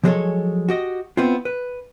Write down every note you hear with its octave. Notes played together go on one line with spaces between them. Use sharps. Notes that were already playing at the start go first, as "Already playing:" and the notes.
F3 F#3 G#3 G#4 A4 C#5
F#4 G4 D#5
B3 C4 E4 F4
B4